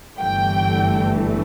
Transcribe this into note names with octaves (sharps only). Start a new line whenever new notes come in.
G1 G2 E3 A3 G5